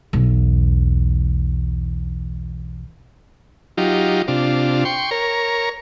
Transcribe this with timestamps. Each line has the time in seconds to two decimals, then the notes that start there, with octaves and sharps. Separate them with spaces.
0.13 B1 E2
3.77 F#3 D#4 F4 G4
4.28 C3 D4 F4
4.85 G5 C6 C#6
5.11 A#4 C#5